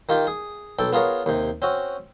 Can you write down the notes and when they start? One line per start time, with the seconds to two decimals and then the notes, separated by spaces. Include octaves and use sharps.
0.09 D#3 F4 G4
0.27 G#4
0.79 B1 A4 G5
0.92 B3 F4 G#4 A#4 C#5
1.26 D#2 C3
1.62 C4 C#4 F#4